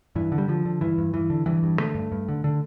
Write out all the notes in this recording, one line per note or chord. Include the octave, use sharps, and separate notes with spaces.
G2 E3
D3
G3
D3 F3
D3
G2 E3
G2
G2 E3
D3
G2 E3
G2
D3 A3
G2
G2
D3
D3